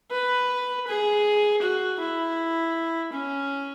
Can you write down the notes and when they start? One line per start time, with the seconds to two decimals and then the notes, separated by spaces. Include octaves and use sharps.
0.11 B4
0.87 G#4
1.62 F#4
2.00 E4
3.13 C#4